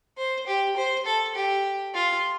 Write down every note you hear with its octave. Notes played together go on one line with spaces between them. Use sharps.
C5
G4
C5
A4
G4
F4